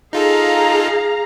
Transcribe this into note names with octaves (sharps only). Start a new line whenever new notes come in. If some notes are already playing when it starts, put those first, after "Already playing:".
D#4 F4 G#4 A4 F5 A#5